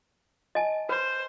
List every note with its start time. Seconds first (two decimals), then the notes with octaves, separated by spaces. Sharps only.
0.55 D#5 G#5 A5
0.89 B4 C5